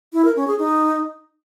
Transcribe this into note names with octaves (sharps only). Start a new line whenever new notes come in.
E4
A#4
C#4
G#4
D#4